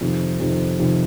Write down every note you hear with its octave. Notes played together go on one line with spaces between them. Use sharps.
F2 C3 D#3
F2 C3 D#3
F2 C3 D#3